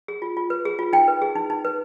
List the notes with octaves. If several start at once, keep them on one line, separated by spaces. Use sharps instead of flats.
G#4
F4
F4
B4
G#4
F4
D#4 G5
B4
G#4
D#4
D#4
B4